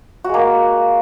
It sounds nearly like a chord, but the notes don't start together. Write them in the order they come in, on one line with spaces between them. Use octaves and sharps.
F#4 G#3 A#3